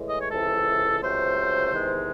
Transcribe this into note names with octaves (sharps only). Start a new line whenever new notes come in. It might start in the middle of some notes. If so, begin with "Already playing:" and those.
Already playing: A2 E3 G#3
D#5
C#5
C#2 C3 E3 A4
C#2 C3 F#3 A3 C5
E2 C3 D#3 G#3